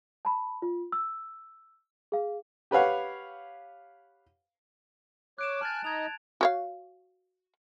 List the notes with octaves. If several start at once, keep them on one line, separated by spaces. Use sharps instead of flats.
A5 B5
F4
E6
G#4 F5
G4 B4 C#5 F5 F#5
C#5 D6 F#6 D7 E7
G#5 A5 F6 F#6 A6
D#4 D#5 G#6 F7
F#4 C#5 F5